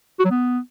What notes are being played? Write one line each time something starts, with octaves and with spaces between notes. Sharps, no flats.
F#4
F#3
B3